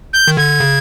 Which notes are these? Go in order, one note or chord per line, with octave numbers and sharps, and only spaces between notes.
G6
D#3
D3 G#6
C#3